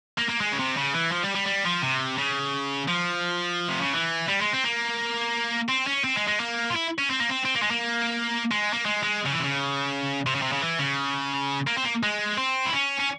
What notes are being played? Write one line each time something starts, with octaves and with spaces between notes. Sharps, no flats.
A#3
A#3
G#3
C#3
C3
C#3
E3
F3
G3
G3
G3
F3
C3
C#3
F3
C3
C#3
E3
G3
G#3
C4
A#3
C4
C#4
C4
G#3
G#3
A#3
F4
E4
C#4
C4
A#3
C4
C4
A#3
G#3
A#3
G#3
A#3
G#3
G#3
C#3
E3
C3
C#3
C3
C#3
C3
C#3
E3
C#3
A#3
C4
A#3
G#3
C4
E4
C#4
C#4